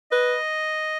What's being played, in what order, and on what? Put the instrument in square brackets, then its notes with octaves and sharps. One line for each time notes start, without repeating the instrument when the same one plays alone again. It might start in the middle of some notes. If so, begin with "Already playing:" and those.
[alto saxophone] B4 [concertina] D#5